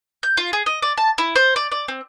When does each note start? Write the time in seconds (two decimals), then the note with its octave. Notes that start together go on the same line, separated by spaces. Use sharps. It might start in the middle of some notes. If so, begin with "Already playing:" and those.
0.23 G6
0.37 F4
0.53 G#4
0.66 D#5
0.82 D5
0.97 A5
1.18 E4
1.36 C5
1.56 D5
1.72 D5
1.88 C4